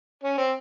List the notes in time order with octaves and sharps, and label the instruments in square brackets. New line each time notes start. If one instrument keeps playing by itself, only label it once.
[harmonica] C#4
C4